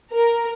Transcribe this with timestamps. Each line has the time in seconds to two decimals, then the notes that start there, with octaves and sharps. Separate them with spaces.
0.13 A#4